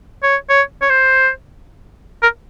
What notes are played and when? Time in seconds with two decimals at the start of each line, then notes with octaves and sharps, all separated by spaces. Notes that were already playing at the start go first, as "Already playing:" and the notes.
0.23 C#5
0.49 C#5
0.82 C#5
0.90 C5
2.23 A#4